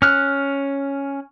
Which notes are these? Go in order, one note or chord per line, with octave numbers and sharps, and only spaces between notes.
C#4 F6 F#6